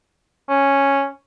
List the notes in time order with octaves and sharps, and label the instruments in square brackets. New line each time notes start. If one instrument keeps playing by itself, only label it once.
[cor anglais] C#4